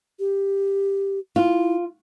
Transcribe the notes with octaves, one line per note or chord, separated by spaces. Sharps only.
G4
E4 F4